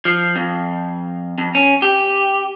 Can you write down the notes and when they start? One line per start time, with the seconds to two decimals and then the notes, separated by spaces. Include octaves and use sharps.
0.05 F3
0.36 F2
1.38 F2
1.55 C#4
1.82 G4